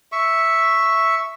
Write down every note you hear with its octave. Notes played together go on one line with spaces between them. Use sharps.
E5 C#6